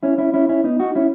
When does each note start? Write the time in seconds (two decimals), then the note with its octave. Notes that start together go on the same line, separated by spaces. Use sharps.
0.03 C#4 E4
0.18 C#4 E4
0.34 C#4 E4
0.49 C#4 E4
0.64 B3 D#4
0.79 D#4 F#4
0.95 C#4 E4